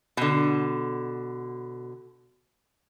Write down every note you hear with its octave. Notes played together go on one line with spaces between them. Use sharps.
B2 D3